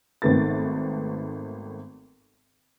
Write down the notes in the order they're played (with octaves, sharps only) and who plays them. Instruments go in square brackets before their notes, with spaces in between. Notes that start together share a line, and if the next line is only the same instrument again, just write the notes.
[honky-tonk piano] G#1 D#3 A3 B3 A6